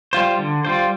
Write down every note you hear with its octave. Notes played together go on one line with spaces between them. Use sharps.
G3 F4 C5
D3
G3 F4 C5